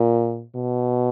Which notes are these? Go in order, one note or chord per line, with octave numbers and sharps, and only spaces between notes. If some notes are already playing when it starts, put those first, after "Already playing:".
Already playing: A#2
B2